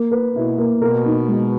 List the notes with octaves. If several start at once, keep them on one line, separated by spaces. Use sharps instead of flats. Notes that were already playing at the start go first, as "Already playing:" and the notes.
Already playing: A#3
B4
B2 E4
A#3
B2 A#4
D#4
G#3